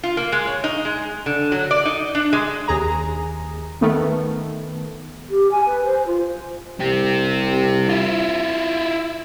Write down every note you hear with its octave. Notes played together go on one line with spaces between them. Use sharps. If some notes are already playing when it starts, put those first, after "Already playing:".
F4
A#3
G#3
C#5
D#4
G#3
D3
F#3
D5
D#4
D4
G#3
D#2 G#4 A#5
D#3 A3 B3
G4
G#5
B4
C5
F4
C2 C4 G4
E4 F4